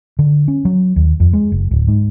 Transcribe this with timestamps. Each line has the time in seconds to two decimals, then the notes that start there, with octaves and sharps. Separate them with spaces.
0.19 D3
0.48 C#4
0.65 F#3
0.96 D#2
1.20 F2
1.33 G#3
1.52 F#1
1.71 D1
1.88 G#2